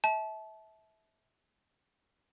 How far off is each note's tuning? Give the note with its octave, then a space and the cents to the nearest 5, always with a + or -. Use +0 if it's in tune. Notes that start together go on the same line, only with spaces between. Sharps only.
E5 -25 A5 -30